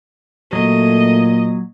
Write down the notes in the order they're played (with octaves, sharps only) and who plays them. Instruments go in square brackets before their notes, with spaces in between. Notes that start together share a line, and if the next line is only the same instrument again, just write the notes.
[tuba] A#2 [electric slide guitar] F#3 [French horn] A3 [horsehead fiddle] D#5